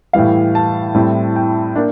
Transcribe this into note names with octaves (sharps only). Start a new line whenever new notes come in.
A2 E3 G3 F5
A5
A2 G3 C4 E4
G5
A#3 D4